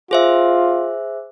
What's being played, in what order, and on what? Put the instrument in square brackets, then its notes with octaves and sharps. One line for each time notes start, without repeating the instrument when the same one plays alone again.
[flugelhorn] F4 [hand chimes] G#4 C5 E5